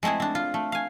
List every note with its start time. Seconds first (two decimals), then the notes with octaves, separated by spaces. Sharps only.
0.03 G#3 A3 C4 E4 G#4
0.20 C4 D4
0.35 F4
0.54 A3
0.72 F5 G#5